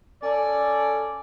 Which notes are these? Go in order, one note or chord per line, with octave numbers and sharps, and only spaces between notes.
C#4 A4 D5